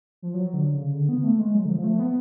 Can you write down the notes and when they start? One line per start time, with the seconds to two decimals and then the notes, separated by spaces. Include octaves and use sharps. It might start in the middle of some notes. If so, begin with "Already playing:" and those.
0.22 F3
0.34 F#3
0.54 D3
0.74 C#3
0.94 D3
1.09 B3
1.24 A3
1.39 G#3
1.54 F#3
1.65 D3
1.69 F3
1.84 A3
1.99 B3